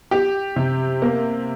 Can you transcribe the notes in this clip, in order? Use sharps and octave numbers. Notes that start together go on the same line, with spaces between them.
G4
C3
A#3